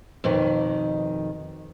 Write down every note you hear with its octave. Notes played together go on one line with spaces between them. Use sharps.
F2 B2 D#3